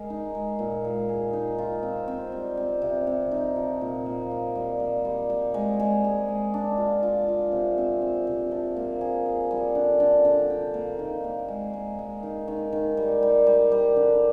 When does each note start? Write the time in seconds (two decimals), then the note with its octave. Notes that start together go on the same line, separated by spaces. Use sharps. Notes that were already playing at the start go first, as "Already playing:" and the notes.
Already playing: G#3 A#4
0.10 D#4
0.35 G#3
0.59 A#2
0.84 G#3
1.09 G#4
1.33 D#4
1.58 F4
1.83 C4
2.08 C4
2.32 G3
2.57 C4
2.82 C3
3.07 C3
3.31 D#4
3.56 F3
3.81 A#2
4.06 A#3
4.31 A#3
4.55 G3
4.80 A#3
5.05 G3
5.30 G3
5.54 G#3
5.80 G#3
6.04 G#4
6.28 G#3
6.54 D4
6.78 F4
7.03 F4
7.28 F4
7.52 C3
7.78 C4
8.02 C4
8.27 C3
8.51 F3
8.76 A#3
9.01 G#4
9.26 G#4
9.51 G3
9.75 D3
10.00 D3
10.25 D3
10.50 G4
10.74 A#3
10.99 D#3
11.24 A#3
11.48 G#3
11.73 G#3
11.99 G#3
12.23 D#3
12.48 D#3
12.72 D#3
12.97 G3
13.23 G3
13.47 G3
13.72 G3
13.96 D3